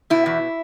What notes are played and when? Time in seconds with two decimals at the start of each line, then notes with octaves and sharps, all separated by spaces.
0.10 B2 E4
0.26 E2